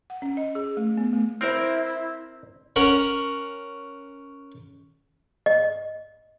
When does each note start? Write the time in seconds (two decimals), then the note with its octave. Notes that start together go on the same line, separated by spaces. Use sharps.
0.10 F#5
0.22 C#4
0.37 D#5
0.55 G#4
0.77 A3
0.97 B3
1.13 A3
1.41 C4 E4 A#4 C5 F6
2.76 C#4 A#4 F#5
5.46 D#5